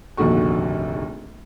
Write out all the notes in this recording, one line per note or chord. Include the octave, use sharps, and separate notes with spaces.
F1 A#1 D#2 D3 F#4 C#6